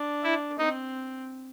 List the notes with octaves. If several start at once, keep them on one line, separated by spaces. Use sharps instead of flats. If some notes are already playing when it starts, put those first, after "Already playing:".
Already playing: D4
E4
C4 D#4